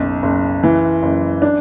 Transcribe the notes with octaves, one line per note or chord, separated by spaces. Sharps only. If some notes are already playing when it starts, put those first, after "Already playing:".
Already playing: F#1 B1
F#1
E3
F#1
D4